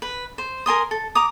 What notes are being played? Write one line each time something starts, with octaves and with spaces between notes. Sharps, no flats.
B4
C5
A#4 G#5 C6 D#6
A4
A#5 D6 D#6